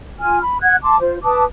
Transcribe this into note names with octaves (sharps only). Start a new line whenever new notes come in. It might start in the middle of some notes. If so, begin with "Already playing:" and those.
F4 G#5 F6
B5
F#5 F#6 G#6
A5 C6 D6
F4 C5
B4 A5 D6 D#6